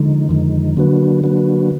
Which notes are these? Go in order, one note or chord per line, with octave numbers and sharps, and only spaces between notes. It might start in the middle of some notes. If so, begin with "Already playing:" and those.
Already playing: D3 F3 G#3 D#4
F2 D#3 F3 G#3 D#4
D3 F#3 A#3 D4 F#4 B4
F#3 A#3 D4 F#4 B4